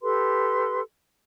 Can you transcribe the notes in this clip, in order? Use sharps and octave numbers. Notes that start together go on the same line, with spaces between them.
G4 A4 B4 C6